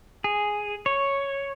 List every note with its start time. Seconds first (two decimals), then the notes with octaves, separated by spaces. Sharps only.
0.24 G#4
0.86 C#5